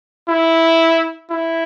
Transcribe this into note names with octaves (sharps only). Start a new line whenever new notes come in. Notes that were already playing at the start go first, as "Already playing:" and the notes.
E4
E4